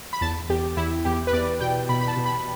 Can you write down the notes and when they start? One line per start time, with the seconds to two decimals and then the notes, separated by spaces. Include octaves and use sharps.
0.13 B5
0.21 E2 A5
0.49 E2 G4
0.77 E2 E4
1.05 E2 G4
1.27 B4
1.33 E2 D5
1.60 B2 G5
1.89 B2 B5
2.01 B5
2.08 A5
2.17 B2
2.26 B5